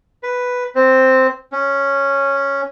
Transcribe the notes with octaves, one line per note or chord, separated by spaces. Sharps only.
B4
C4
C#4